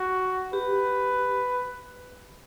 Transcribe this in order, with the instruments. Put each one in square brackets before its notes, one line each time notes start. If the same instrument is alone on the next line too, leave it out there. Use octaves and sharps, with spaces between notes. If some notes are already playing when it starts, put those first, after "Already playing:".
Already playing: [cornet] F#4
[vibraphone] G4 [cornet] B4